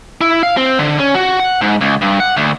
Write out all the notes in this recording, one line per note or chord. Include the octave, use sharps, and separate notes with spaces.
E4
F5
C4
D3
C#4
F#4
F#5
G#2
C#2
G2
F#5
D2